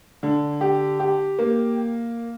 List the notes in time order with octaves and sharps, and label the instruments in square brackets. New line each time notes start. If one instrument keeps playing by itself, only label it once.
[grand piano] D3
G4
G4
A#3